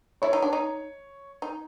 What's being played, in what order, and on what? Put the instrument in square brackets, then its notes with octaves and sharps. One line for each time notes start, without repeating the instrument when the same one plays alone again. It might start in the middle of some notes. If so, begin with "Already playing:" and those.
[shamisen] E4 [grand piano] C#5
[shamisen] D#4
D4
D#4
D#4